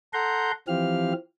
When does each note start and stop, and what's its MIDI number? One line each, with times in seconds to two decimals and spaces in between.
0.13 0.52 69
0.13 0.52 78
0.13 0.52 82
0.13 0.52 84
0.13 0.52 91
0.68 1.13 52
0.68 1.13 53
0.68 1.13 60
0.68 1.13 67
0.68 1.13 77
0.68 1.13 89